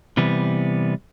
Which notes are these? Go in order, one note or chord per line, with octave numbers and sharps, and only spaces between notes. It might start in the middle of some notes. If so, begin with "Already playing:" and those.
C3 E3 G3 B3